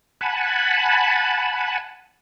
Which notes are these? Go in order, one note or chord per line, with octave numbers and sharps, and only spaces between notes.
F#5 G#5 A5 B5